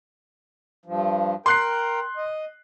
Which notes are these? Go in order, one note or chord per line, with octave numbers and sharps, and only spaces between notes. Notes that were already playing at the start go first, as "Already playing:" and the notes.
G2 F3
A#4 G5 C6 F#6 C7
D#5